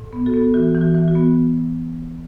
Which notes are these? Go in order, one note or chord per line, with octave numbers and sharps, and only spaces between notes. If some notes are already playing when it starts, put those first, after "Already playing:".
Already playing: A2
B3
F#4 A4
B3
E3 F#4
E3
F#4
E3
F#4
B3